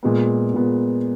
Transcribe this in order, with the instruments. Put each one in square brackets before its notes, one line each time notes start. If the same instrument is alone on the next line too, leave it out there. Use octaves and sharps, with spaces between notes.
[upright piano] A#2 G#3 B3
A#2 G#3 B3